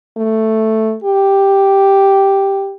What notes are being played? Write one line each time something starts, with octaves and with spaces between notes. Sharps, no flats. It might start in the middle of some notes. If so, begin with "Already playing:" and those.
A3
G4